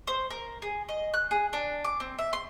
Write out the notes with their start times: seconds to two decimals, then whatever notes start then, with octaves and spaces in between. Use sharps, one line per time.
0.07 C5
0.30 A#4
0.62 G#4
0.89 D#5
1.14 F#6
1.31 G#4
1.53 D4
1.84 D6
2.00 C4
2.19 E5
2.33 C6